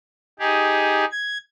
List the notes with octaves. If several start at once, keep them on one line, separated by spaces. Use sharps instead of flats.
D#4 G4 G#4
G#6